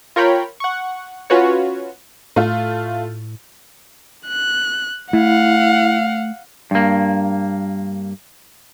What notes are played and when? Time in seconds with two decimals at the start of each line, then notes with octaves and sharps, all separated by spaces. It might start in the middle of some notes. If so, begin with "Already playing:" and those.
0.16 F4 A#4 C#5 G5 B5
0.60 F#5 C#6
1.30 C#4 F4 F#4 B4 C#5
2.36 A2 A3 F4
4.28 F#6
5.13 A3 E4 F5 F#5
6.71 G2 A#3